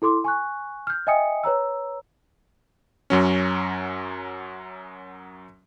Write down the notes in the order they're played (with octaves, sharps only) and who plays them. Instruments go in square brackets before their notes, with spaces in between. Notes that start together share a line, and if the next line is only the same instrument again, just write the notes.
[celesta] E4 A4 C6 D6
G#5 C#6 F#6
F6 G6
D#5 E5 G5 G#5 D#6 C#7
B4 C#5 A#5 E6
[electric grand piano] F#2 F#3 C#4